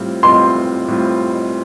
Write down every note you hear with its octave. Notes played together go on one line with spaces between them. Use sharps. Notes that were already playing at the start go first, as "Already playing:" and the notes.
Already playing: A2 G3 C4 F4
A2 G3 C4 F4 C6
A2 G3 C4 F4